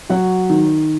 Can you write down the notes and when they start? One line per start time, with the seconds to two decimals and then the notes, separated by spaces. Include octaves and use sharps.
0.09 F#3 F#4 F#5
0.50 D#3